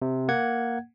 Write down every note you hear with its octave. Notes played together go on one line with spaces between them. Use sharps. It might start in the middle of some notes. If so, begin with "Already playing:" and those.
C3
A#3 F#5 G#6